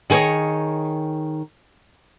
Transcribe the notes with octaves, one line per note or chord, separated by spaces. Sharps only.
D#3 G#4 B4 C#5 D#5